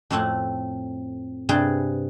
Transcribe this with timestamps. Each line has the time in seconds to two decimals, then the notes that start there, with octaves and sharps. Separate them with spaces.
0.10 F2 A2 A3 C4 F#5
1.49 G2 C3 G#4 B4 G5 A5